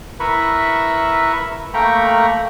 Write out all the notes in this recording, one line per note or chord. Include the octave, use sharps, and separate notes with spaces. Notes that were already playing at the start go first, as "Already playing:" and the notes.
E4 A#4 B4 E5 B5 C#6
A3 A#3 G5 A#5 B5 C#6